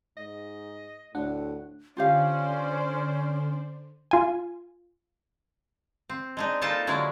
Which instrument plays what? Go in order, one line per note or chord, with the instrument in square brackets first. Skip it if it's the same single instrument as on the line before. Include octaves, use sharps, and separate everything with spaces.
[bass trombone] G#2 [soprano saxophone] D#5
[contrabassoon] D2 [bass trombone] A2 [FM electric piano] D4 F#5
[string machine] D3 [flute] C#4 [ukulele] F4 G4 F5 [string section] C5 D5
[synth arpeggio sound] F4 G#5
[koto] C4
G#3 D4 D#4
G3 A#3 D#4 F4 A4 A5
D3 F#3 G#3 E4 A#4